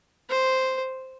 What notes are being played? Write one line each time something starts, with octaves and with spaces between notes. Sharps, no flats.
C5